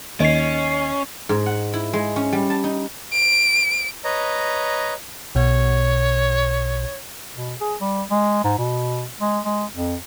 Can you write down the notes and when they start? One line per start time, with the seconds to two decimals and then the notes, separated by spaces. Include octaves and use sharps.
0.20 D#2 C#4 D#5 C7
1.29 G#2
1.46 F#5
1.74 E4
1.93 G#3
2.16 C#4
2.33 G3
2.50 A5
2.64 D#4
3.13 D7
4.04 B4 C#5 D#5 A#5
5.35 B1 B2 C#5
7.36 B2
7.61 G#4
7.81 G3
8.11 G#3
8.44 G#2
8.58 B2
9.21 G#3
9.45 G#3
9.75 F2